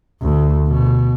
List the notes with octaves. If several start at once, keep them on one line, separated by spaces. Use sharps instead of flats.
D2
B2